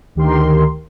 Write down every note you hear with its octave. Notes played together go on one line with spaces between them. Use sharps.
D2 D#3 G4 A#4 C6